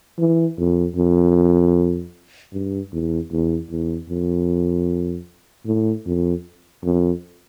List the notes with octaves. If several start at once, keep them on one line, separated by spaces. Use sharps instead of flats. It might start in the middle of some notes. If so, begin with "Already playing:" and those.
E3
F2
F2
G2
E2
E2
E2
F2
A2
F2
F2